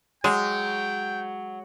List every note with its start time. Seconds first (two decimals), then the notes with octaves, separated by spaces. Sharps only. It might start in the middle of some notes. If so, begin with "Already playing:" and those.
0.24 F#3 G#3 G5